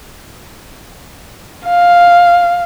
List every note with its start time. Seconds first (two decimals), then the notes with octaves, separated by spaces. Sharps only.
1.67 F5